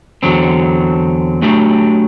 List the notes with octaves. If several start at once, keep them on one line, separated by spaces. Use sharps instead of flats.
E2 D3 F#3 C4
F#3 A3 D4 G4